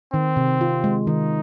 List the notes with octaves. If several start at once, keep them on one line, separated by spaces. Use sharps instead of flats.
D#3 C4
C3
F4
G#3
D#3 D#4